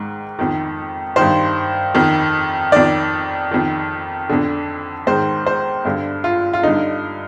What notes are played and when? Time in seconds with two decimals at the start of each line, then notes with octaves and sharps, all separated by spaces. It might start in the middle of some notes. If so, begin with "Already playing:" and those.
Already playing: G#2 D#3
0.39 F2 D#3
1.16 G2 D#3 C5
1.95 F2 D#3
2.72 F2 D#3 D5
3.51 F2 D#3
4.29 F2 D3
5.07 G#2 D#3 C5
5.46 C5
5.85 G2 D3
6.24 F4
6.53 F4
6.63 G2 D3 D#4